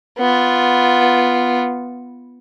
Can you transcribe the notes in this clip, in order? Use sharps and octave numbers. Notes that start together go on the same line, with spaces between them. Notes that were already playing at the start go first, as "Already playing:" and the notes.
B3 F4